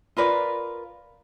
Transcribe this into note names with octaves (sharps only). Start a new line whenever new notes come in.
F4 A#4 B4 D5